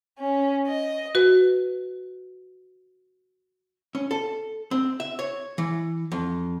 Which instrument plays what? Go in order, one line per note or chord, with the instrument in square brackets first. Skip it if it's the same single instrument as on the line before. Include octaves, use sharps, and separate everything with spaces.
[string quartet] C#4
D#5
[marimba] F#4 B4
[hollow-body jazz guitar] C#4
A4
C4
E5
C#5
E3
F2